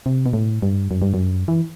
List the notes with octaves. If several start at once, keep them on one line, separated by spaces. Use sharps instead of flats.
C3
B2
A2
G2
F#2
G2
F#2
E3